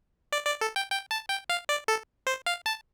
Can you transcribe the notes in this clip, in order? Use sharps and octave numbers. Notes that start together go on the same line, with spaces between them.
D5
D5
A4
G5
G5
A5
G5
F5
D5
A4
C5
F5
A5